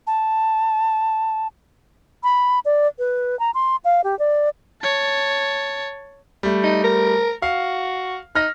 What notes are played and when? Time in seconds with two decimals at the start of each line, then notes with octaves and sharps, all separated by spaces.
0.07 A5
2.23 B5
2.65 D5
2.99 B4
3.39 A#5
3.54 C6
3.85 F5
4.04 G4
4.19 D5
4.82 C#5 A5
6.43 G3 A3
6.64 D#4
6.84 A#4
7.42 F#4 F5
8.35 D#4 F6 A#6